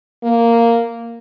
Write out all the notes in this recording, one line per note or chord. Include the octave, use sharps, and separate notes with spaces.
A#3